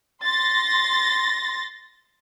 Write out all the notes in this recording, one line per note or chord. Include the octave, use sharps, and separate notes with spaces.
C6 A6 A#6